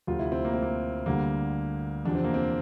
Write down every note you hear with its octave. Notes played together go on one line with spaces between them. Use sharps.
D2 C3 F3 F4
E4
C4
A#3
C4
A#3
D2 D3 G3 A#3
E2 C3 F3 D4
C4
A#3
C4